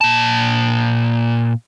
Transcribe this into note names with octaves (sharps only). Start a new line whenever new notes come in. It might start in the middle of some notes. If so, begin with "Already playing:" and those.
A#2 A5